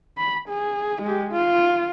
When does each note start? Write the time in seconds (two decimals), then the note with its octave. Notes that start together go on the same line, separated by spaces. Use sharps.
0.17 B5
0.49 G#4
1.02 G#3 G4
1.32 F4